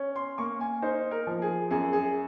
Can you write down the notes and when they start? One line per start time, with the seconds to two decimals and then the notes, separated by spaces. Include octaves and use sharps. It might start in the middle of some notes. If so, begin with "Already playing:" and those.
Already playing: C#4
0.16 C6
0.38 A#3 C#6
0.60 G#5
0.82 D#4 C5
1.11 A#4
1.27 F3
1.42 G#4
1.71 F#2 G#4
1.93 G#4